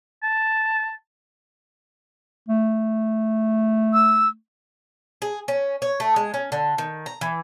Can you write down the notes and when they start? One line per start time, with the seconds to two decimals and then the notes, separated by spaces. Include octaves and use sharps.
0.23 A5
2.49 A3
3.93 E6
5.22 G#4
5.48 C#4
5.82 C#5
6.00 A3
6.16 G#3
6.34 C#4
6.52 D3
6.78 D#3
7.06 A#5
7.21 E3